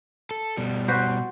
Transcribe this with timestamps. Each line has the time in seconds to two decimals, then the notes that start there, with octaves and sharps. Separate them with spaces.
0.31 A4
0.57 B2 G3
0.88 F#4 B4 C5